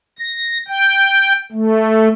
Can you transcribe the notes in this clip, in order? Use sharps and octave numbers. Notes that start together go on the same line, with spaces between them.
A#6
G5
A3